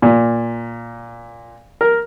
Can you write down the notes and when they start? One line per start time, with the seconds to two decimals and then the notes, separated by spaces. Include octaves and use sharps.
0.02 A#2
1.81 A#4